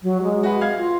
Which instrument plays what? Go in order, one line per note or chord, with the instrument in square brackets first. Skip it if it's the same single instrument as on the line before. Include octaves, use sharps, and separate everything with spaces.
[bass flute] F#3
G#3
[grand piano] F#4 B4
F5 G#6
[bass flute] F4